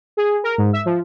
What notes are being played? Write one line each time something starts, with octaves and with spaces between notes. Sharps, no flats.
G#4
A#4
G#2
E5
F3